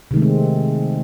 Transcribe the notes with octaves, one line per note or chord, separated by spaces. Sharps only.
C3 D#3 G#3 A3 C4